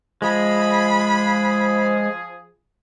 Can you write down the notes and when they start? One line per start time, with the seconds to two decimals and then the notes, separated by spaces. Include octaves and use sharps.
0.22 F3 G#3 G#4 B5